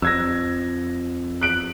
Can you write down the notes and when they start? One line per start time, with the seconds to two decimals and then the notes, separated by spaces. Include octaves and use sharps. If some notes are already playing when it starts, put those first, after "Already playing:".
0.02 F2 E6 G#6 A#6
1.41 F#6 D7 F#7